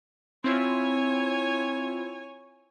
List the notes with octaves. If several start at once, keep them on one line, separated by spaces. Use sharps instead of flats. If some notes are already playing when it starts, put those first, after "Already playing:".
C4 E4 F4 C#5 G#5